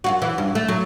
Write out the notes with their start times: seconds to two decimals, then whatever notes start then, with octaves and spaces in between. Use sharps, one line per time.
0.04 F#2 F4 F#4
0.22 E3
0.38 G2
0.55 A3
0.68 F#3